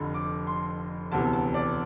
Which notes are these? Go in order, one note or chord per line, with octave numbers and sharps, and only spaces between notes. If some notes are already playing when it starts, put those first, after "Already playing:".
Already playing: F1 F2 D3 B5
D6
C6
E1 D2 C3 E3 B3 A5
A5
D5